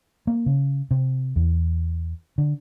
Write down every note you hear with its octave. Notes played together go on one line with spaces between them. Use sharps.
A#3
C#3
C3
E2
D3